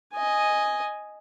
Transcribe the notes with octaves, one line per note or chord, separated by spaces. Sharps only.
D#5 G#5